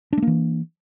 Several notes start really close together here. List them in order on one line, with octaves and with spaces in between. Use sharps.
D4 A3 A#3 E3